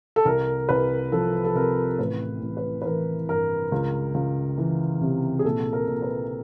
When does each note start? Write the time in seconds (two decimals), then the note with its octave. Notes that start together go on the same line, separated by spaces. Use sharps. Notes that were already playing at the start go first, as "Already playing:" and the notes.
0.16 A4
0.25 C2 A#4
0.69 C2 B4
1.12 F3 A4
1.45 A4
1.55 C3 A#4
1.99 A1 B4
2.42 A1
2.57 B4
2.82 B4
2.85 E3 A#4
3.29 G2 A#4
3.72 C#2
4.14 C#2
4.58 E3
5.01 C3
5.39 G#4
5.45 A#1 A4
5.73 A#4
5.87 A#1
6.02 B4